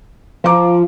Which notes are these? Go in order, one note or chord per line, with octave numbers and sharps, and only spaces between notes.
F3 F5 A#5 D6